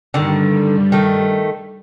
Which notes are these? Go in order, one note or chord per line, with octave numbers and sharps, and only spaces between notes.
G2 D3 D#3 G3
D#3 A3